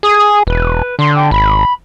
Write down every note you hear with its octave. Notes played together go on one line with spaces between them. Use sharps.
G#4 D#6
E1 B4
D3 C6
G5
G#1 B5